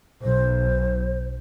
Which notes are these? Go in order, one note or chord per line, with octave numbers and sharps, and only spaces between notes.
B1 C5